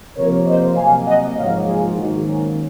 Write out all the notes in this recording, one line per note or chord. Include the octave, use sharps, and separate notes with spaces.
C3 F3 A#3 A#4 C#5
C5 D#5
C3 F#3 A#3 F5 G#5
D#5 F#5
G#2 F3 A#3 C#5 F5
F4 G#4
G#2 D#3 F#3 A#3 D#4 F#4
C#4